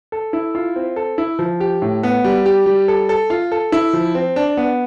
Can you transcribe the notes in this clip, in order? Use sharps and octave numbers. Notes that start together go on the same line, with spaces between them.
A4
E4
F4
C4
A4
E4
F3
G4
A2
B3
G3
G4
G3
A4
A4
F4
A4
E4
F3
C4
D4
B3